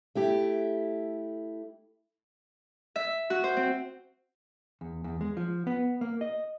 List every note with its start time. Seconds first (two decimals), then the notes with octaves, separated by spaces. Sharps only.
0.15 A3 E4 G4
2.96 E5
3.30 F#4
3.44 C5
3.57 C4
4.81 E2
5.04 E2
5.21 G#3
5.37 F3
5.67 B3
6.01 A#3
6.21 D#5